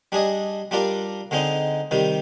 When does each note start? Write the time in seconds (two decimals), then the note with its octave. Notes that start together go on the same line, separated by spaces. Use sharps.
0.12 G3 D4 G#4 D#5
0.71 G3 D4 F4 A#4 D5
1.31 D3 G#3 C4 D#4
1.91 C3 D#3 G3